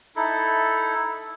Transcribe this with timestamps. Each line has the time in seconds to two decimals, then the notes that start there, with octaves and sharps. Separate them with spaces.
0.16 D#4 E4 A4